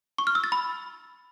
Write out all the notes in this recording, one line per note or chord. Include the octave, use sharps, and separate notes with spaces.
C#6
F6
E6
A6
B5